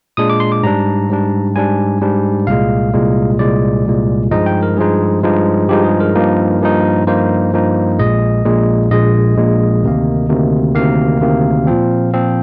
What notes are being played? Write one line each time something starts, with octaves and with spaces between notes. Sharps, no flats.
A#2 G#3 D4 D#6
D6
C6
D6
G#2 G3 D4 A#5
G#2 G3 D4
G#2 G3 D4 G#5
G#2 G3 D4
C2 A#2 G#3 F5
C2 A#2 G#3
C2 A#2 G#3 D5
C2 A#2 G#3
G2 F3 G#3 D#4 D#5
G5
A#4
G2 F3 G#3 D#4 G#4
G2 F3 G#3 D#4
G2 F3 G#3 D#4 G4
G#4
A#4
G2 F3 A#3 D#4
G2 F3 A#3 D#4
G2 F3 A#3 D#4 C5
G2 F3 A#3 D#4
A#1 A#2 G#3 D#5
A#1 A#2 G#3
A#1 A#2 G#3 D#5
A#1 A#2 G#3
D2 C3 D#3 A#3
D2 C3 D#3 A#3
D2 C3 D#3 A#3 F5
D2 C3 D#3 A#3
A#2 F3 C4
A#2 F3 C4